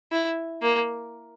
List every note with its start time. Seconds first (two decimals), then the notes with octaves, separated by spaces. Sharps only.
0.12 E4
0.62 A#3